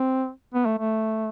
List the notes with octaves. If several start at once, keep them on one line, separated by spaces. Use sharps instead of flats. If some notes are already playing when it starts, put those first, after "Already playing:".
Already playing: C4
B3
A3
A3